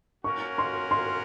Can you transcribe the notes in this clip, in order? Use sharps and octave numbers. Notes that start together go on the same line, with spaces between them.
A#3 C#4 F#4 A#4 C#5 C#6
C6
C6